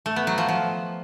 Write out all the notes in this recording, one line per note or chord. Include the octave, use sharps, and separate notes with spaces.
A3
B3
F#3
F3
F3